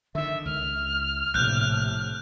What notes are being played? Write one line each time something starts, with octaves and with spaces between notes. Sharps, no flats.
D3 D#3 E5
C#2 F6
A#1 A2 C3 F#6 G6